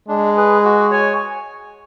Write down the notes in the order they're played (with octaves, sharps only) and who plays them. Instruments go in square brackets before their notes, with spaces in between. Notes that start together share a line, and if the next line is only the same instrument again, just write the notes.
[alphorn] G#3 [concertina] D4
[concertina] G#4 B4
F#4
C#5 G#5